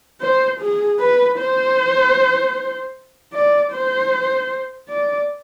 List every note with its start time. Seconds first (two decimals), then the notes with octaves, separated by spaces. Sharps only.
0.21 C5
0.60 G#4
1.00 B4
1.39 C5
3.33 D5
3.72 C5
4.89 D5